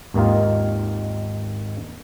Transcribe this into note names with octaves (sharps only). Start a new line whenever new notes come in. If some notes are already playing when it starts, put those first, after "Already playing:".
G#1 D#2 D#3 D#4 F4